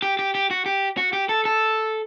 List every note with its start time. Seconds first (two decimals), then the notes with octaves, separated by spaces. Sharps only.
0.02 G4
0.19 G4
0.35 G4
0.51 F#4
0.66 G4
0.97 F#4
1.13 G4
1.29 A4
1.45 A4